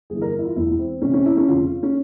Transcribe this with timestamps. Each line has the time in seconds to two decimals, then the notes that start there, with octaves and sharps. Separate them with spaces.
0.10 G1 G2 E3 G#4
0.22 A#4
0.39 E4
0.45 F4
0.56 E1 E2 E3 E4
0.79 C4
1.02 C2 C3 E3 C#4
1.13 C#4
1.26 E4
1.37 C#4
1.48 F1 F2 C#3 F4
1.83 C#4